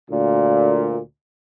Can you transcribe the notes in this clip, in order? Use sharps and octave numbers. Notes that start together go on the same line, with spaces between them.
D2 A#2